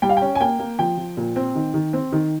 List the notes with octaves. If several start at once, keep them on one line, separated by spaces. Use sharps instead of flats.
G3 G5
F5
C#4 G5
G#5
A#3 G5
A#3
F3 G5
F3
A#2
C4
D#3
D#3
C4
D#3